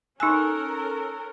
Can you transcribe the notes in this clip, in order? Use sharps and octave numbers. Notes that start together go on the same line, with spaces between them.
C#4 D#4 A4 A#4 G#5 C#6 E6 F#6